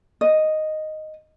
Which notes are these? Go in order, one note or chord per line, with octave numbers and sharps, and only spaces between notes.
D#5